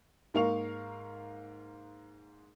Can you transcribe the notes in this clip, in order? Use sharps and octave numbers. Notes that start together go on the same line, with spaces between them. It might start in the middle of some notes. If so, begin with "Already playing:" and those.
G#2 A#3 A#4 F5 C#6 F7